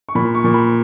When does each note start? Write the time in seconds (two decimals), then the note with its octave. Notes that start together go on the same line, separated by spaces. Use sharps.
0.09 C#6
0.15 A#2 B5
0.35 C#6
0.44 A#2
0.54 B5